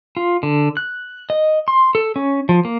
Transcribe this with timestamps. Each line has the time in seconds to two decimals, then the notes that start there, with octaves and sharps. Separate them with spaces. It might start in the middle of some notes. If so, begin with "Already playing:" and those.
0.17 F4
0.43 D3
0.77 F#6
1.30 D#5
1.68 C6
1.95 A4
2.16 C#4
2.49 F3
2.65 A#3